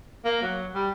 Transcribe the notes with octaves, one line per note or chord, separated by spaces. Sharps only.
A#3
F#3
G3